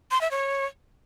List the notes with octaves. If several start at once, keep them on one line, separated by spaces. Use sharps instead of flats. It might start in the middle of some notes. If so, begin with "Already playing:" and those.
C6
E5
C#5